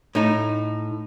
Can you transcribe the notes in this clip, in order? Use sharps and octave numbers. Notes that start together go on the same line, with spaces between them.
A2 D#4